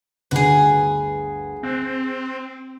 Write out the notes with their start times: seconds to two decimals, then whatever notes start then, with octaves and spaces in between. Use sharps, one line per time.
0.31 G1 D2 G#4 B4 F#5
1.63 C4 F#6